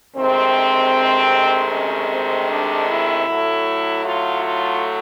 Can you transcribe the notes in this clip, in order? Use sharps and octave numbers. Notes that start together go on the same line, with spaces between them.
D2 C3 D#3 G#3 C4
C#4
C4
D4
E4
A2 F#3 A3
F4
F4